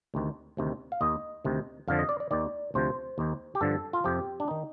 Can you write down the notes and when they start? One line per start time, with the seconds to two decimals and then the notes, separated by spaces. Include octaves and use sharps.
0.14 D2 C3 D#3
0.57 D2 C3 D#3
0.92 F5
1.01 D#2 D#3 D#5
1.45 D2 C3 D#3
1.88 F2 D3 F3 F5
1.99 D#5
2.09 D5
2.20 D5
2.31 D#2 D#3 D5
2.74 D2 C3 F3 C5
3.18 D#2 D#3
3.55 G4
3.61 G2 D3 F3 A4
3.93 F4
4.04 F2 C3 F3 G4
4.40 D4
4.48 D#3 D#4